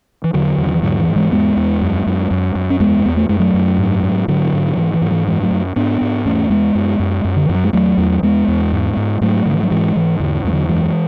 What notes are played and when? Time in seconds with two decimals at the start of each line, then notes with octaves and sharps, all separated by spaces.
0.24 E3
0.33 E2 D3 F#3
0.58 E2
0.66 D3
0.74 E3
0.82 G#2 D3 F#3
1.00 E3
1.08 G#2
1.16 E3 G#3
1.32 E2 G#3 B3
1.57 E2
1.81 F#2
2.06 F#2
2.31 F#2
2.55 F#2
2.70 C#4
2.80 E2 G#3 B3
3.05 E2 B3
3.17 A3
3.29 F#2 G#3
3.40 F#3 A3
3.54 F#2
3.78 G#2
4.03 G#2
4.28 G#2 D3 F#3
4.53 G#2
4.77 G#2 E3
4.94 E3
5.02 G#2 F#3
5.11 E3
5.27 F#2 E3 G#3
5.43 F#3 A3
5.51 F#2
5.76 G#2 B3 D4
6.01 G#2
6.25 E2 A3 C#4
6.50 E2 G#3 B3
6.75 F#2
7.00 F#2
7.25 F#2
7.36 D3
7.46 E3
7.49 F#2
7.55 F#3
7.64 G#3
7.73 E2 F#3 A3
7.98 E2
8.22 E2 G#3 B3
8.48 E2
8.73 G#2
8.97 G#2
9.21 G#2 F#3 A3
9.46 G#2 D3
9.54 E3
9.63 F#3
9.70 G#2 E3 G#3
9.96 G#2 E3
10.20 E2 D3
10.44 E2 G#3
10.53 D3 F#3
10.69 F#2 E3 G#3